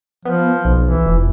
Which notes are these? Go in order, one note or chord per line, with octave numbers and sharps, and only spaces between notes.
F3 B3
B1
E3
F1